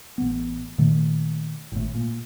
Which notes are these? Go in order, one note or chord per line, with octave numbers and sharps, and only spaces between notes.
A1 B3
A#2 D#3 A3
G#1 A2
A#2